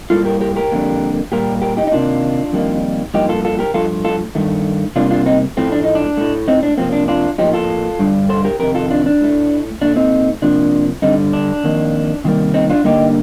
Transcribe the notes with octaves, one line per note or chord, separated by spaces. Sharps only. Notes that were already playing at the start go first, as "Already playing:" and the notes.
A2 G3 A#3 F4 A4
G4 A#4
G4 A#4
G4 A#4
F2 D3 G3 A#3
A#2 G3 A#3 G4 A#4
G4 A#4
D#4 G4
D#4
C3 D#3 A#3 D4 F4
F2 D#3 G3 A#3
G2 F3 A#3 D#4 G4
F4 A4
F4 A4
G4 A#4
G2 F3 A3 F4 A4
F4 A4
G2 D#3 A3
C3 G3 A#3 D4 F4
D4 F4
C4 D#4
A2 F3 A3 C4
D4
D#4
D4
A2 A3
C4 D#4
D4
C3 F3 A#3 C4
D4
D4 F4
A2 F3 A#3 D#4 G4
F4 A4
G2 D3 G3
A4 C5
G4 A#4
F2 C3 D#3 G4 A#4
F4 A4
D4 F4
D4
A2 A3
A#2 A3 D4
C4 D#4
C3 F3 A#3 D4
G2 D3 G3 C4 D#4
D4
F2 D#3 A#3
C3 D#3 G3 A#3
C4 D#4
D4 F4
G2 D3 G3 A#3 D#4 G4